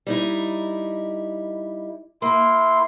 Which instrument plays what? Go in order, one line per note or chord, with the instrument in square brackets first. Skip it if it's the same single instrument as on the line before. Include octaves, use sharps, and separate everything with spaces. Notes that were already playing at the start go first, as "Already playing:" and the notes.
[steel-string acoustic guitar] G3 D#4 E4
[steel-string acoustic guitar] A#3 [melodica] E4 C6